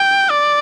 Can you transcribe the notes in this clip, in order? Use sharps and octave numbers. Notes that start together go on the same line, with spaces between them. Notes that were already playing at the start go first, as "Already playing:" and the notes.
Already playing: G5
D5